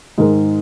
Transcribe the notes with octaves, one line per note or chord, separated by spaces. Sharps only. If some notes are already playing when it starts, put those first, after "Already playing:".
G#2 D#3 G#3 D#4 A#4